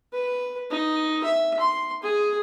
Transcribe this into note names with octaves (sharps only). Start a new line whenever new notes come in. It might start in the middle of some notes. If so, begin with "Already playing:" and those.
B4
D#4
E5
C6
G#4